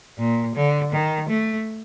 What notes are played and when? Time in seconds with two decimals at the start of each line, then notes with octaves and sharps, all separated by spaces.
0.18 A#2
0.55 D3
0.92 D#3
1.29 A3